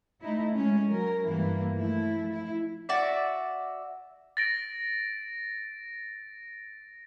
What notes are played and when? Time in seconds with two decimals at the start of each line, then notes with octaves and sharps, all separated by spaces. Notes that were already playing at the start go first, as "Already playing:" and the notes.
0.22 A3 D#4 E4
0.53 G#3 C#4
0.89 F#3 A#4
1.27 G2 E3 A#3 E4
1.72 F3 A3 E4
2.32 E4
2.89 F#4 D5 E5
4.37 A6 A#6 D7